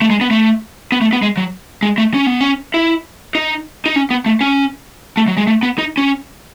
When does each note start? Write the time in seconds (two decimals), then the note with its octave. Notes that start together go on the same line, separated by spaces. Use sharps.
0.02 A3
0.10 G#3
0.21 B3
0.31 A3
0.92 B3
1.02 A3
1.13 B3
1.22 G#3
1.37 F#3
1.83 G#3
1.98 A3
2.14 C#4
2.27 B3
2.40 C#4
2.74 E4
3.35 D#4
3.86 D#4
3.96 C#4
4.10 B3
4.26 A3
4.41 C#4
5.17 A3
5.28 F#3
5.37 G#3
5.47 A3
5.63 B3
5.78 D#4
5.98 C#4